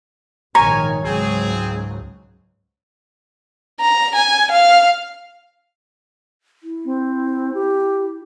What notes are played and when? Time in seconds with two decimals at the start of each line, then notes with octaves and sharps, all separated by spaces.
0.55 A#1 G#2 D#3 A#4 C#5 G#5 A#5
1.05 C#2 G#2 F#3 C4 G#4
3.80 A#5
4.16 G#5
4.51 F5
6.63 E4
6.85 C4
7.54 G4